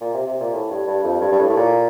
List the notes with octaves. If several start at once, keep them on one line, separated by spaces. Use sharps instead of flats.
A#2
C3
C3
A#2
A2
G2
G2
F2
G2
G2
A2
A2
A#2